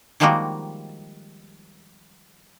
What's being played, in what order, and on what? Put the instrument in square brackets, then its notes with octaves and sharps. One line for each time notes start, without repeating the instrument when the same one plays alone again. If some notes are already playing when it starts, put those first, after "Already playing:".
[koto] D#3 F3 G3 G#3 A#3 F#4